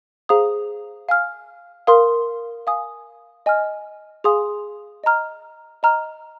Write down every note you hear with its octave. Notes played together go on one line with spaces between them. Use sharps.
G#4 C5 F5 A#5 D#6
F5 G#5 F6
A#4 F5 C6 D#6
F5 G#5 D#6
D#5 G#5 F6
G#4 F5 G#5 C6 D#6
D#5 A#5 F6
D#5 A#5 F6